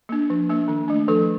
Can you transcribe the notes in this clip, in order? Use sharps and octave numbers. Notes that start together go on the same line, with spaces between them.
A#3 D4
F3
A#3 D4
D#3
A3 D4
F3 A4